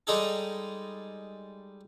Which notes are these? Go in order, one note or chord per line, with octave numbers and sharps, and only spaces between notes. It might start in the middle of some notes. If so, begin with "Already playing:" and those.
G3 G#3 D#4 G#4 A4